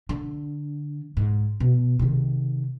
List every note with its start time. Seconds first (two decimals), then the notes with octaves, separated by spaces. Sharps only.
0.09 D3
1.17 G#2
1.60 B2
1.99 C3 D#3